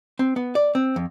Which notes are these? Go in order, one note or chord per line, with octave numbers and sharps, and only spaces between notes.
C4
B3
D5
C4
F2